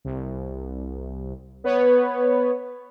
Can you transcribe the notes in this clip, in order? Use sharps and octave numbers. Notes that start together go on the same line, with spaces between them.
C2
B3 B4 C#5